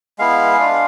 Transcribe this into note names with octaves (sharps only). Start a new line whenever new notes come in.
G#3 B3 E4 F5
G#3 D4 F4